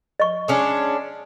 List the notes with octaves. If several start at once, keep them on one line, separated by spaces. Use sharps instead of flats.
D#5 C#6
G#3 C#4 D4